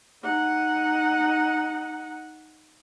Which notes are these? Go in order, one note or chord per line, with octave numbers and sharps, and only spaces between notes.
D#4 F#5